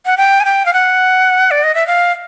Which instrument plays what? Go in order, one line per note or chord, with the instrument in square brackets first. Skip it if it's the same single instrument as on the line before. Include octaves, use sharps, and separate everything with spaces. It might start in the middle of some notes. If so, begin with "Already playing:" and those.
[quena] F#5
G5
G#5
G5
F5
F#5
D5
D#5
E5
F5